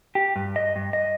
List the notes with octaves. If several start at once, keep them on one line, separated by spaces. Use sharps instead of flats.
G4
G2
D#5
G2
D#5